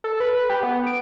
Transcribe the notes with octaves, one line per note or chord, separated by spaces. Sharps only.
A4
B4
G4
B3
D7